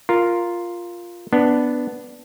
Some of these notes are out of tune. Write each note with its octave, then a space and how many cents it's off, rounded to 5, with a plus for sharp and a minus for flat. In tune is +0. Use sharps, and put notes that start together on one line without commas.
F4 +0 A#4 +0
B3 +0 D4 +0